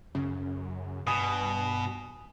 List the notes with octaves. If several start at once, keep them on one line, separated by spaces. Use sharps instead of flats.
F#2 C#3
G2 B2 G#5 B5 D#6